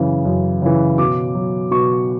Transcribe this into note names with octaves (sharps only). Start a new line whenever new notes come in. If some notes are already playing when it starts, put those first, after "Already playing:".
Already playing: F#2 C#3 E3
F#2
C#3 E3
B2 D6
F#3
B2 C#6